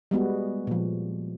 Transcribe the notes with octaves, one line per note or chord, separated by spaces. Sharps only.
G3 G#3 B3 F#4
A#2 F3